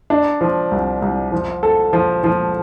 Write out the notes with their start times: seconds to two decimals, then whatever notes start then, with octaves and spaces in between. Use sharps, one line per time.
0.10 D4
0.41 F3
0.71 C2
1.02 C2
1.32 F3
1.63 A4
1.93 F3
2.24 F3